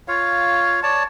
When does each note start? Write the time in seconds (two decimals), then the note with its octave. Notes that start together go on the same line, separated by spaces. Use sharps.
0.08 F4 C#5 F5
0.83 C#5 D5 A5